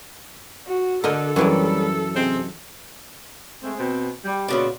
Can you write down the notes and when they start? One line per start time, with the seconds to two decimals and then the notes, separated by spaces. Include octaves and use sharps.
0.67 F#4
1.04 D3 A4 A#4 D#5
1.36 F#2 E3 F#3 G3
2.15 C3 G#3 C4
3.63 G#3 A3 C4
3.78 B2 C4
4.25 G3
4.48 A#2 C#3 B3 F#4 D5